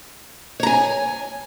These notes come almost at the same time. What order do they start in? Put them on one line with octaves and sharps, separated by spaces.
C#5 A#5 G#5